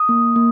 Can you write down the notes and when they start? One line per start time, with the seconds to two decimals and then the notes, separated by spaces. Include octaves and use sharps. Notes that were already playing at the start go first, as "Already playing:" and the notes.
Already playing: D#6
0.09 A#3
0.36 A#3